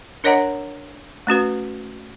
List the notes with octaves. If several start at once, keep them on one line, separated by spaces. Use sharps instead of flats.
D4 A#4 C#5 D#5 F#5 A#5
A3 C#4 F#4 B4